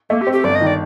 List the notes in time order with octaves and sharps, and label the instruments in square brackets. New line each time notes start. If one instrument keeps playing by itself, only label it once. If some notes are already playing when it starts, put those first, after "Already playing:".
[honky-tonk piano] A3 [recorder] A#3
[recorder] G4
[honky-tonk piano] C4
[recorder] G4
[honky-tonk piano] G1 [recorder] D5
[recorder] D#5
[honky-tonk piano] D#3
[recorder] D5